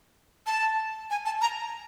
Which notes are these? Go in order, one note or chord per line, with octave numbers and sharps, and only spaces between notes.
A5
G#5
A5
A#5